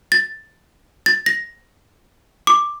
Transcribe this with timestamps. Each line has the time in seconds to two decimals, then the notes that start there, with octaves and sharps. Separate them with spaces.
0.12 A6
1.06 A6
1.26 A#6
2.47 D6